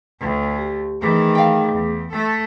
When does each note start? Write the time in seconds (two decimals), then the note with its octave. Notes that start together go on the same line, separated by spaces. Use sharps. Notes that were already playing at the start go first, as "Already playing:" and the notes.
0.20 D2
0.58 G4
1.01 D#3 E3 A3 G#4 D6
1.35 F5 G5
1.72 E2
2.12 A3 A4